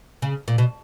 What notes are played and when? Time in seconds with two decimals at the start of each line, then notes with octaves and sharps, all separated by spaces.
0.22 C#3
0.48 A#2
0.58 B2